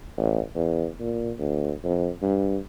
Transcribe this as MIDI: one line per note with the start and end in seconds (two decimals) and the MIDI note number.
0.17 0.40 33
0.56 0.87 40
1.00 1.31 46
1.39 1.72 38
1.84 2.09 41
2.22 2.57 43